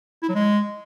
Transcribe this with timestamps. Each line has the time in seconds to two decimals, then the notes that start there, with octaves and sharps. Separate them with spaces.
0.22 E4
0.29 F#3
0.35 G#3